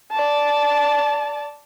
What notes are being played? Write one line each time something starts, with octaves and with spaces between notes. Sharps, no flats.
D5 A5